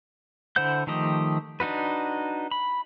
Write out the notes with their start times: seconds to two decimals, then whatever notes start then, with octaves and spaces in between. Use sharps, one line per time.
0.56 D3 E4 C5 F#5 G6
0.87 D#3 F3 A3 G4 D#5
1.60 D4 D#4 F#4 B4
2.51 B5